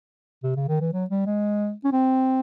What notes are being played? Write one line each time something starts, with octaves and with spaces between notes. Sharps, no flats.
C3
C#3
D#3
E3
F#3
G3
G#3
C#4
C4